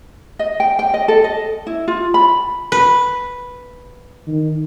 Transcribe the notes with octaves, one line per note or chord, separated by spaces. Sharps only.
D#5
G5
G5
D#5
A4
D#5
E4
F4
B5
B4
D#3